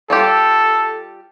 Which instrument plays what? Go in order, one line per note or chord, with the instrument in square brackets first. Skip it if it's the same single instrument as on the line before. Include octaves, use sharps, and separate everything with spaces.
[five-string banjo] G3 F4 G4 [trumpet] A4